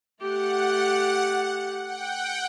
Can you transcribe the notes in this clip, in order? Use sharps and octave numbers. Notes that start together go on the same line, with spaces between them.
A3 G4 F#5
F#5 G5